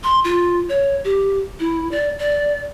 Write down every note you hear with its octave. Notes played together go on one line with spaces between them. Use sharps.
C6
F4
C#5
G4
E4
D5
D5